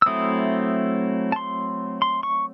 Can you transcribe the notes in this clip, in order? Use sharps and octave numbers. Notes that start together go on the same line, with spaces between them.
E6
F#3 A3 C4 E4 D#6
A5
C6
C6
C#6